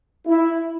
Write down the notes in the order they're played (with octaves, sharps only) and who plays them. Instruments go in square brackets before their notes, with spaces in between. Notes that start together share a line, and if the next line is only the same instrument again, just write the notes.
[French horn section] E4